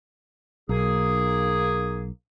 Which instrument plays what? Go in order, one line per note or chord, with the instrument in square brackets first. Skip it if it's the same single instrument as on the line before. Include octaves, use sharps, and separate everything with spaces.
[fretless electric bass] B1 [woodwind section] A#3 D#4 G#4